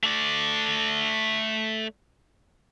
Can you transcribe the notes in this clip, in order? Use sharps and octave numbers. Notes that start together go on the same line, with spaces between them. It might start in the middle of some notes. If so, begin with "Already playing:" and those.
A3 D5